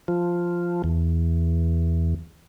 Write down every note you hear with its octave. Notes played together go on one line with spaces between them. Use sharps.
F3
E2